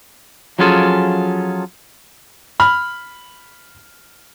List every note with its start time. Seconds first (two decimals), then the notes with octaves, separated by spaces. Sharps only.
0.59 F3 F#3 C#4 F4 G#4 A4
2.60 B5 F6